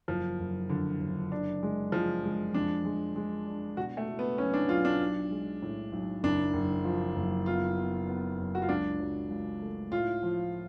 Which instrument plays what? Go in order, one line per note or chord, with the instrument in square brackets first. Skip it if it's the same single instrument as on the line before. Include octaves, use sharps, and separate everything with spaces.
[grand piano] F#1 [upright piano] F3
[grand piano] F#1
[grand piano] F2 [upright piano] D3
[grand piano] F#1
D4
G#3
[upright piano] F3 [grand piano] G#3
[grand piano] G#3
[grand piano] F2 [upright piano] D4
[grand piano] G#3
G#3
D4
[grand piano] B2 [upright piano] F#4
[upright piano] A3
[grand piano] A3
[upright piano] B3
[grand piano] B1 [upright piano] C#4
[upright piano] D4
[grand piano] B1 [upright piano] F4
[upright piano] D4
[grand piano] B1
G#3
A2
B1
[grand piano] F#1 [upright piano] D4
[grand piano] F#1
F3
F#1
[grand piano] B3 [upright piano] F4
[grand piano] B3
B3
F#2
[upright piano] F#4
F4
[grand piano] C#2 [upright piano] D4
[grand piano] F#3
C#2
A3
[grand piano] A2 [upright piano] F4
[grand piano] F3